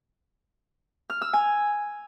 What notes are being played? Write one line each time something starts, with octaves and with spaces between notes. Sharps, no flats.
F6
E6
G#5